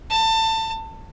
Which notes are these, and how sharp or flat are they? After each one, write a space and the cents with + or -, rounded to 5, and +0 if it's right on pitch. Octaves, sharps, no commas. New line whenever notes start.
A5 +25